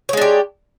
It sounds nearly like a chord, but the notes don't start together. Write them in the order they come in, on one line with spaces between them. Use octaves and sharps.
C#5 G#3 D4 G4